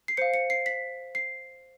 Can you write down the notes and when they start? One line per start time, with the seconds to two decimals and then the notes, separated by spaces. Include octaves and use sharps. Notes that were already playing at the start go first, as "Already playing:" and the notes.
0.08 C7
0.17 C5 F5 C#7
0.34 C#7
0.50 C7
0.66 B6
1.15 C7